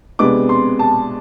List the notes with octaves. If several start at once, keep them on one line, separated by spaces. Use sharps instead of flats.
F2 C3 G#3 B3 D4 D6
C6
A5